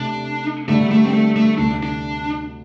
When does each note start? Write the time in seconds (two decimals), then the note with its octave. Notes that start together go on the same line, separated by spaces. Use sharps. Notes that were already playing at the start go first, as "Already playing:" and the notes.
Already playing: C3 A3 C4 D4 G4
0.68 G2 D3 G3 A3 D4
0.91 A3
1.06 C4
1.13 A3
1.36 A3
1.58 D2 C3 A3 D4
1.83 D4